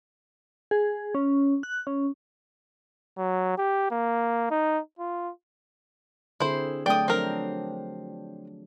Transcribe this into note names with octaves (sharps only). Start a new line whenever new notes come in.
G#4
C#4
F#6
C#4
F#3
G4
A#3
D#4
F4
D3 C4 E4 G#4 C5
F#3 A3 D4 D5 G5 D#6
F3 F#3 C4 D4 A#4